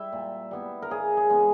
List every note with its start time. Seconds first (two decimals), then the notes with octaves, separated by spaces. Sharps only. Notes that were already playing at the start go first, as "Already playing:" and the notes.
Already playing: G3 E4 E5 G5
0.13 A#2
0.51 G3 B3 E4
0.82 A#4
0.90 C#3 G#4
1.17 G#4
1.29 E3 G#3 B3